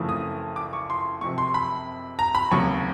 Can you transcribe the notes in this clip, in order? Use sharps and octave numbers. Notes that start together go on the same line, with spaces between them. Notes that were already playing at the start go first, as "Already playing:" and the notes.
Already playing: F#1 F2 C#3 E3 A3
D#6
D6
C#6
C6
F#1 F2 C3 C#6
C6
B5
A#5
B5
F1 D#2 C#3 F#3 C#6